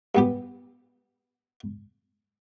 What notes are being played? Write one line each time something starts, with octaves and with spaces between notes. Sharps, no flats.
G2 B3 G4